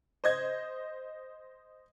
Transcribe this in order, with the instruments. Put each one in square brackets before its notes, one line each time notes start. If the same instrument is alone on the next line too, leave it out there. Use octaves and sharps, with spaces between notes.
[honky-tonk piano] C5 D#5 G#6